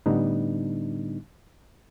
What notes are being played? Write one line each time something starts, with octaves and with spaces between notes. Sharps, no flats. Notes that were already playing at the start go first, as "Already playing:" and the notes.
A2 D3 G3 B3 D4 D#4